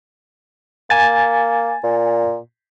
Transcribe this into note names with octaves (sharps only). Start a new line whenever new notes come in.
A#3 G#5 A6
A#2